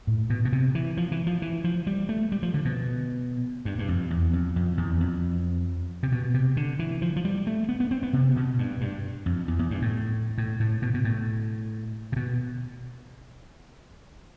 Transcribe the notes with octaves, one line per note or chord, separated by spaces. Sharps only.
A2
B2
B2
C3
E3
F3
E3
F3
E3
F3
G3
A3
G3
F3
D3
B2
G2
G2
F2
E2
F2
F2
E2
F2
C3
B2
C3
D3
E3
F3
F3
G3
A3
B3
B3
C4
B3
C3
B2
G2
G2
F2
E2
E2
G2
A2
A2
A2
B2
B2
A2
C3
B2